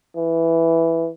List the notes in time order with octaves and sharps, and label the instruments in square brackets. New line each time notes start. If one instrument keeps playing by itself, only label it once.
[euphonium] E3